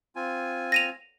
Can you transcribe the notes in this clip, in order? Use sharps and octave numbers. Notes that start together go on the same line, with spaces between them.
C4 F4 G#5
A#6 D#7 F7